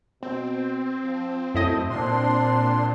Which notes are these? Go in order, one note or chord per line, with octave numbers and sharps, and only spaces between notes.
B2 C4
F3
F#2 A3 E4 D#5
A#2 C4 D4 C6